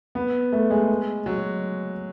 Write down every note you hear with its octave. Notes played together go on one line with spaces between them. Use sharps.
B3
A3
G#3
F#3